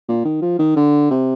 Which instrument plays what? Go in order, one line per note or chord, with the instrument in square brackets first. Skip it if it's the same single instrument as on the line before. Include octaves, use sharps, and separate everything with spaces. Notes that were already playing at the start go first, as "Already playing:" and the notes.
[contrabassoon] A#2
D#3
F3
D#3
D3
C3